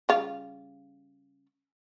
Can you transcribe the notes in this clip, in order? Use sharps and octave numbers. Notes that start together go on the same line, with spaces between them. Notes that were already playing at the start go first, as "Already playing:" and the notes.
C#3 G3 F4